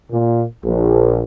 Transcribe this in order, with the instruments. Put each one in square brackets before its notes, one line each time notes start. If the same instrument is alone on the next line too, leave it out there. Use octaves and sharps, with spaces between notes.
[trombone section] A#2
A#1